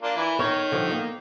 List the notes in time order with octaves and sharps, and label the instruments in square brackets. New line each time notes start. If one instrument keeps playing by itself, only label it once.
[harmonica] A#3 D4 F4
E3 E4
[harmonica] D#3 [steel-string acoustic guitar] C#5
[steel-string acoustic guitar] D3 F3 G3
A#3